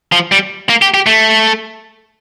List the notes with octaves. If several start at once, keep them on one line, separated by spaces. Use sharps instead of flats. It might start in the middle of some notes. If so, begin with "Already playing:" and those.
F3
G3
A#3
G4
G4
A3